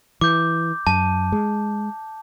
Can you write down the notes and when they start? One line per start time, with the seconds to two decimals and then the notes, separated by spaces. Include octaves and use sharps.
0.21 E3 D6 G6
0.87 F#2 A5
1.32 G#3